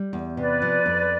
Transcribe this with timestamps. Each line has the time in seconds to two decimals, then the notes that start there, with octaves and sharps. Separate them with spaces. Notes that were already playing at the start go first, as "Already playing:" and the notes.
Already playing: G3
0.13 E2
0.37 C3 B4 D5
0.62 F3
0.86 F2